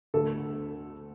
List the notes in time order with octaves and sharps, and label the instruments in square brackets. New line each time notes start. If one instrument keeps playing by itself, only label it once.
[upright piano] D2 D3 A3 A4